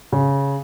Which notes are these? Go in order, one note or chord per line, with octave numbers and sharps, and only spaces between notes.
C#3